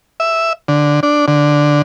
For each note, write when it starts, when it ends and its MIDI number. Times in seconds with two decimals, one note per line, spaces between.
0.20 0.53 76
0.68 1.00 50
1.03 1.26 62
1.28 1.82 50